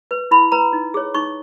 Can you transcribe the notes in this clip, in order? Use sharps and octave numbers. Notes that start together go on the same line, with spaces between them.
B4
E4 B5
B4 A#5
D#4
G#4 C#5
D#4 C#6